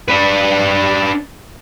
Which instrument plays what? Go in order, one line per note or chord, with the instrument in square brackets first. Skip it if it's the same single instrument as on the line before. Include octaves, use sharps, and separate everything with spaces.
[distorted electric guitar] D4 B4